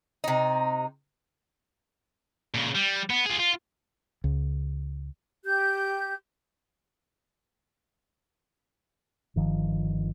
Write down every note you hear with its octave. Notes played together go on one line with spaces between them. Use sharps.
C3 D#4
A#2 C#3
G3
B3
F4 G#4
F4
C#2
G4 G6
G1 D#3 F3